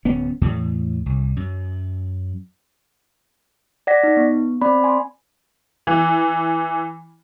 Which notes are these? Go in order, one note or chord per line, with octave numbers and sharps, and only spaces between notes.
D1 B3 C#4
E2 A2
C2
F#2
D5 F#5 A#6 B6
D#4
B3
C4 D5 B5
G#5 C6
E3